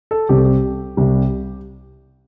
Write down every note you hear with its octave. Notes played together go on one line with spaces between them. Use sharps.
A4
C2 C3 G3 G4
A4
G4
C2 C3 G3